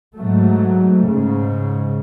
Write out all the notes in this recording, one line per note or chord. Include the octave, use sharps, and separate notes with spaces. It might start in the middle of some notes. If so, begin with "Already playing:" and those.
G#2 F#3 A3
G#2 C#3